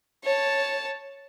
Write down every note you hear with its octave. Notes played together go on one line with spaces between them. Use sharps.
C#5 A5